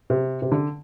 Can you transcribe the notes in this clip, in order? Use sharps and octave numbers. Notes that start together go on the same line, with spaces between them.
C3
C3
D3